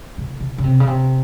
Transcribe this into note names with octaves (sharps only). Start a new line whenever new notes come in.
C#3
C#3
C#3
C3
C#3
C3